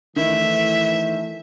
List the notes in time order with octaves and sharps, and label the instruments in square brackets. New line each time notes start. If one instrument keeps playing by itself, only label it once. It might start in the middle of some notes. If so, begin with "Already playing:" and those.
[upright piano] D#3 E4 [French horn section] E3 A3 [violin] E5